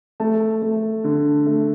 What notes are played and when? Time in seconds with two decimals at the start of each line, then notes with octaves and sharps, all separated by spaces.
0.20 A3 A5
0.62 A3
1.04 D3
1.46 A3